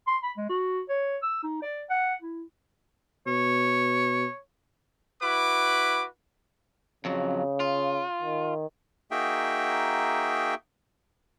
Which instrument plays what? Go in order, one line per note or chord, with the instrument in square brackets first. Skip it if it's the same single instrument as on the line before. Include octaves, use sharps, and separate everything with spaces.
[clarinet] C6
B5
G#3
F#4
C#5
E6
D#4
D5
F#5
E4
[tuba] B2 [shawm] C#5
[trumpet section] E4 F#4 B4 D6
[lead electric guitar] F2 F#3 [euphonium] C#3
[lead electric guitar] F4
[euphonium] D#3
[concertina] A#3 D#4 F#4 G#4 E5 G5